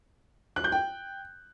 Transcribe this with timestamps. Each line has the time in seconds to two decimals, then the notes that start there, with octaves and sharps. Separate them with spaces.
0.56 F#6
0.64 G6
0.72 G5